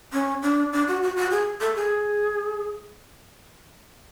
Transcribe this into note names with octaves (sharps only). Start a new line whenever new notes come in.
C#4
D4
D4
F#4
F#4
F#4
G#4
A4
G#4